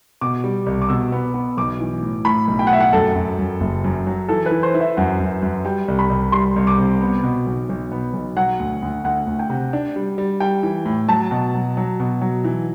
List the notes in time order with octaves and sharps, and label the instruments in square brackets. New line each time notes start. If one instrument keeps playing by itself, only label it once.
[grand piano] B2 [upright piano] D6
[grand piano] G3
C2
[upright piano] D6
[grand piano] B2 [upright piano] E6
[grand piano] B3
B3
[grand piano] B1 [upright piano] D6
[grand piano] E3
A2
[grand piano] A2 [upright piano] B5
[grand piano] B1
[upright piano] G5
F#5
[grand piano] A2 [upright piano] E5
[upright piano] F#5
[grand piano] F#2 [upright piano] A4
[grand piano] F#2
F#2
F#1
F#2
F#3
[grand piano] E3 [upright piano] A4
[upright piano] B4
[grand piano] E3
[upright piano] C5
[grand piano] E4
[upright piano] E5
[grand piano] F#2 [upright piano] F#5
[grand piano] F#2
F#2
[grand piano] G3 [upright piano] G5
[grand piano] C2
[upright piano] B5
[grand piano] C2
[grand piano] G3 [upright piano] C6
[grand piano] C2
[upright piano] D6
[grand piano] C3
B3
B2
B1
B1
B3
B1
[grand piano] F#3 [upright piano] F#5
[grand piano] D2
D2
[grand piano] D2 [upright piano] F#5
[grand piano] D2
[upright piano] G5
[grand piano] C3
D4
G3
G3
[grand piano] G3 [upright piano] G5
[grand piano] E3
A2
[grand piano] F#3 [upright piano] A5
[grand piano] B2
F#3
F#3
B2
F#3
E3